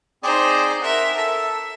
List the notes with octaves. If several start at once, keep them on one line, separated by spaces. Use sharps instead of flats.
C4 D#4 G#4 C5 D5
A#4 E5 F#5
A4 E5